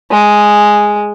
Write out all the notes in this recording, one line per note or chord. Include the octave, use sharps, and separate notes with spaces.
G#3